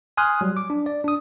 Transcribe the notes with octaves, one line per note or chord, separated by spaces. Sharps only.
G#5 C6 D#6 F6 F#6
F#3 G3
D6
D4
D5
D4 D#6